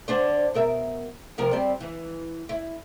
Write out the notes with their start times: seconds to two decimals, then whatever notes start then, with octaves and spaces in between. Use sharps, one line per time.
0.08 D3 D4 C5
0.54 B2 A#4 E5
1.38 C3 F3 A#4
1.51 G3 C4
1.80 E3
2.49 E4